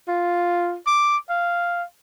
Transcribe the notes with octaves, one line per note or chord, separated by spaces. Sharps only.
F4
D6
F5